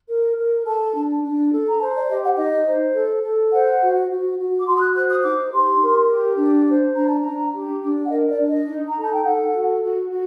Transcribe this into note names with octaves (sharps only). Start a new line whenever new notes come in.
A#4
A#4
A4 A5
D4
D4
A4
A#5
C5 A5
D5
G4 D#5
F#5
D#4 D#5
C5
A4
A4
C5 F#5
F#4
F#4
F#4
D6
F#4 C6
D#6
F#6
C5 F#6
D#6
D#4 D6
G4 C6
A#4
G4
D4
C5
D4 A#5
A5
D4 A#5
G4
D4
F#5
A#4 D#5
D5
D4
D#5
D#4
A#5
A4
A5
G5
A4 F#5
F#4
F#4
F#4